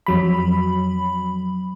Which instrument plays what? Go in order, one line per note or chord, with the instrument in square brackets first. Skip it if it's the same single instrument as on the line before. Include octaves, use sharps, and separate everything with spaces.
[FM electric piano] F2 F#3 B5